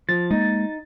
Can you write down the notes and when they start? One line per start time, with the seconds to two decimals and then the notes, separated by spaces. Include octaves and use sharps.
0.09 F3 A6
0.31 G#3 A#3 D#4